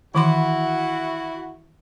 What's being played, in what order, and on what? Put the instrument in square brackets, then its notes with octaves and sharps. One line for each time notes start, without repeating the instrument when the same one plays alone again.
[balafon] D#3 E3 C6 [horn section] E4 F#4